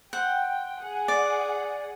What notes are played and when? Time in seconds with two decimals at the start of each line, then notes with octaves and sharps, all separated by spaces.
0.13 C5 F#5 G5
0.80 G#4 F#5
1.08 D5